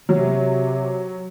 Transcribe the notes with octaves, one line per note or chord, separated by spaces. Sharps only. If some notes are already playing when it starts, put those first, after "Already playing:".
C3 F#3